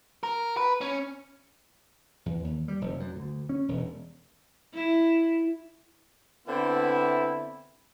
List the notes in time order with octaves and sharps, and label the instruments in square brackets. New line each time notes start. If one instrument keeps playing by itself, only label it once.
[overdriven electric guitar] A#4
B4
C#4
[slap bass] E2
D#2
G3
F1
F#2
D2
C#4
E1
[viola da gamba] E4
[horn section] D3 B3 C4 E4